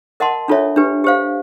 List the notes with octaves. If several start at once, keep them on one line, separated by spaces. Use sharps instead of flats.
A#4 D#5 F#5 A5 C6
D4 F4 A4 C#5 E5
D4 G4 B4
G4 C5 F5